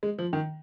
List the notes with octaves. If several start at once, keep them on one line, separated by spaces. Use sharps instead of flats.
G#3
F3
D#3